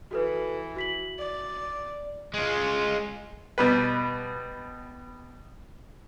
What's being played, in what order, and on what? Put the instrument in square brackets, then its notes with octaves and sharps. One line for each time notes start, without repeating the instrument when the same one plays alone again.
[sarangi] E3 [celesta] F#4 A4 B4
[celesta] F#4 B6 F#7
[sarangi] D5
[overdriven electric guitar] G#3 F4
[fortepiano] B2 G3 B4